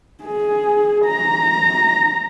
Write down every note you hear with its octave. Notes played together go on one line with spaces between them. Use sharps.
G#4
A#5